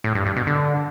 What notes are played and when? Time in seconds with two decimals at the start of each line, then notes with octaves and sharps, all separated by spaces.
0.04 A2
0.15 G2
0.26 G2
0.36 B2
0.47 D3